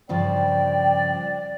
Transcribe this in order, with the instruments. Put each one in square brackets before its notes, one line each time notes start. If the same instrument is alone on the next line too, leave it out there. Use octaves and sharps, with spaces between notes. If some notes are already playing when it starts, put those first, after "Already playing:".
[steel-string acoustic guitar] G2 C#3 F3 [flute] D5 [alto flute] G5